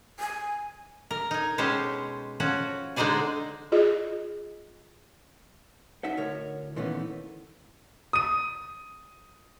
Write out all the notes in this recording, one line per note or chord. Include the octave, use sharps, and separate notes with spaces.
G#5
A#4
D#4 G#5
B2 G#3 C#4 G4 C5 A5
F3 C#4 F#4
D3 G#3 D#4 C5 D5 G#5
F4 G#4 D#5
D#4 E5 F#5
D2 A2 A#4 C#5
A#2 D#3 E3 A3 B3 C#4
D#6 D#7